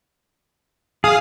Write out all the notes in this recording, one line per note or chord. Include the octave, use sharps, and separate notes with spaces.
G#4 F5 D#6